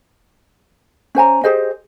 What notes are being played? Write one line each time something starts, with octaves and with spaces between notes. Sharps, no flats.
C#4 C5 G#5 A#5
G4 G#4 C5 D#5